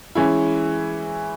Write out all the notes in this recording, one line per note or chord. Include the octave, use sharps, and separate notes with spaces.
E3 G#3 C#4 E4